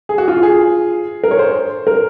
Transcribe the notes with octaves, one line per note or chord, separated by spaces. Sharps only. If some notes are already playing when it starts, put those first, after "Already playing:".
G#4
F#4
F4
G#4
A#4
C#5
C5
A#4